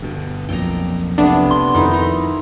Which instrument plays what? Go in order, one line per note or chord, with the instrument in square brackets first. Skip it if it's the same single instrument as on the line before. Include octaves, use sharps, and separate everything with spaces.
[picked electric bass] G1 G2 B2
[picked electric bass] B1 F2 A#2 [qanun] G5 A#5
[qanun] C3 A3 B3 [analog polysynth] D4
[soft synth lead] C6
[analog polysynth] F2 [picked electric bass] D#3 [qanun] D#4 E4 B4
[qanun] A#5